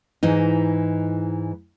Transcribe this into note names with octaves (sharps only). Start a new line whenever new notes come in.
G#2 E3 D#4